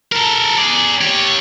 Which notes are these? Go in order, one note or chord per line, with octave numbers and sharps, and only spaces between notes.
A4 A#4
G#4 D5
G4 C#5